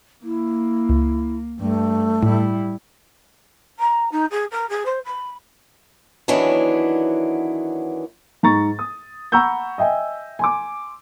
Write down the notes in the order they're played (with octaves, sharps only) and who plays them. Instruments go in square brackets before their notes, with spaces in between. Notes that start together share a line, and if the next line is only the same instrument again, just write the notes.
[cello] A#3 [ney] E4
[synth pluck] C#2
[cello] G2 [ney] A3
[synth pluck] A2 [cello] G3 E4
[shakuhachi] A#5
D#4
G#4
A#4
G#4
C5
B5
[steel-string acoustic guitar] D#3 E3 F#3 B3 C#4 D4
[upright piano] G#2 A#5 C#6 A6
D#6
F#5 A#5 B5 C#6 E6 G6
D#5 E5 G5 G#5
G#5 C6 D6